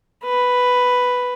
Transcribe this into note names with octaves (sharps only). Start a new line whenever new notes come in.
B4